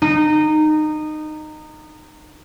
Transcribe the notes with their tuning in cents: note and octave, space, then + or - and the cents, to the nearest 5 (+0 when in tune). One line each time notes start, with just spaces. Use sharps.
D#4 -20